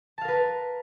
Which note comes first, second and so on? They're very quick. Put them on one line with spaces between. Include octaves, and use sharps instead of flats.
A5 F5 A#4 B4